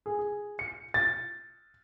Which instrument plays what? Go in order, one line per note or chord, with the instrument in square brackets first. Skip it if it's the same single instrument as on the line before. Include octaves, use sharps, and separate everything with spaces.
[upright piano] G#4
G#4
C#7
A6